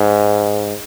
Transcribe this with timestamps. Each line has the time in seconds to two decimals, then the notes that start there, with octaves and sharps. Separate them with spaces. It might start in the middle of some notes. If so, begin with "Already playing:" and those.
Already playing: G#2